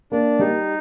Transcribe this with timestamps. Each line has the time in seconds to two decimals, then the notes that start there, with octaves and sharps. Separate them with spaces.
0.12 A#3 D4
0.39 G3 D#4